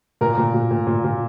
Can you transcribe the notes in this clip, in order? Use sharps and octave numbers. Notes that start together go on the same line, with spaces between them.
A#2 A#4
A#2
A#2
A#2
A#2
A#2